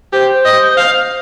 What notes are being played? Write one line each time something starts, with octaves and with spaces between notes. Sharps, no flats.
G4 C5
D#5
F5